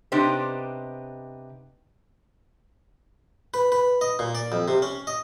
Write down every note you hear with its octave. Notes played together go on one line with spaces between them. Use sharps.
C3 B3 D4 D#4 G4 C5
B4
B4
D#5
A#2
D5
F2
C3
C#4
D#5